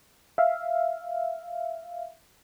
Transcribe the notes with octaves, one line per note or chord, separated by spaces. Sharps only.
E5 F5